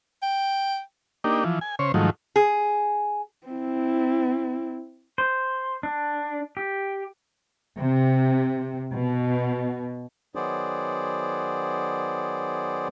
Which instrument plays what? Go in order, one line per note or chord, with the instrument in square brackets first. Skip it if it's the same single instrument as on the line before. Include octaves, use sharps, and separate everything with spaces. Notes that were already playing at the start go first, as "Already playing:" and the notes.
[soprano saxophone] G5
[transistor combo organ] A#3 D4 D#4 G4
E3 F3
G#5
C#3 C5 C#5
G#2 D#3 F3 F#3 A3
[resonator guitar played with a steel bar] G#4
[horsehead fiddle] C4 E4
[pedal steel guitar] C5
D4
G4
[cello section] C3
B2
[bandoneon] D#3 F#3 B3 G#4 C5 D5